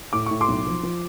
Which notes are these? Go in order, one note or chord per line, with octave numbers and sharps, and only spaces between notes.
A2 D6
A2 C#6
C6 D6
B1
F3
F3